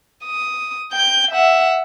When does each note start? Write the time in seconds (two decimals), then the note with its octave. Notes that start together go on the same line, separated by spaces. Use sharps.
0.25 D#6
0.92 G5 G6
1.31 E5 F#5